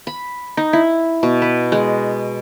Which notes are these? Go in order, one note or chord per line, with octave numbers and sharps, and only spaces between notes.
B5
D#4
E4
B2
B4
G#3